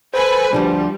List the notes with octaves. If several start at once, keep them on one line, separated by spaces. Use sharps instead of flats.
A4 B4 C5 G#5
D2 F3 G3 D4